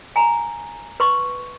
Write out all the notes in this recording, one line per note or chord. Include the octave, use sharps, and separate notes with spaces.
G#5 A#5
B4 C6 C#6